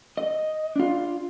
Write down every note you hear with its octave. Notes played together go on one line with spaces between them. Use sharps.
D#5
D4 F4